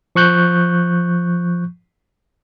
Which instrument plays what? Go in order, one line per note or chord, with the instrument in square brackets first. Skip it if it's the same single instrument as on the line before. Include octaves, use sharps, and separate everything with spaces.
[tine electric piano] F3 C#6 F#6 G6